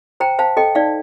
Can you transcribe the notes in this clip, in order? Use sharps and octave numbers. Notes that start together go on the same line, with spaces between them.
C5 G5 A#5
C5 F5 A5
A4 D#5 G5
D#4 D5 F5